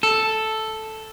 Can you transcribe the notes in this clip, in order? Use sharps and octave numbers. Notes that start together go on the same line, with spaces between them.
A4